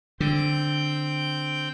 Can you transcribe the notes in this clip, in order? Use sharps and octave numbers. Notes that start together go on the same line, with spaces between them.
D3 C4 G5 G6